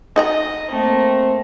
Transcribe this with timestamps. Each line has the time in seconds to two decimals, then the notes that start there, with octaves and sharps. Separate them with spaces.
0.16 D#4 D#5 F#5 A#5
0.72 A3 A#3 C4